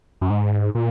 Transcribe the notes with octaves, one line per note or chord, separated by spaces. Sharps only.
F#2
G#2
A#2